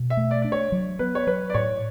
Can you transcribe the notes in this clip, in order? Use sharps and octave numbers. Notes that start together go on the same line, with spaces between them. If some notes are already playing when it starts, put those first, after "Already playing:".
Already playing: B2
E5
A3
D5
D4 D5
C#5
F#3
B3 B4
C#5
F#3 B4
D5
A2 C#5